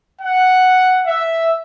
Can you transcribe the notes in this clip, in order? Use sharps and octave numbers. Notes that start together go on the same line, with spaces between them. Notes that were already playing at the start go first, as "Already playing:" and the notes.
F#5
E5